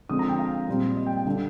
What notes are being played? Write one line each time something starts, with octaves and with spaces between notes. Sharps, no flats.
D3 F3 G#3 C4 D#6
A#5
G5
F5
A#2 G3 C4
D#5
G5
G5
D3 G3 D4